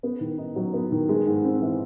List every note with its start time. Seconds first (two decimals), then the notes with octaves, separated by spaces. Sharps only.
0.03 B3
0.21 D#3
0.38 D#4
0.56 F#3
0.73 B3
0.92 D#3
1.09 G#3
1.27 G#2
1.45 C4
1.62 E3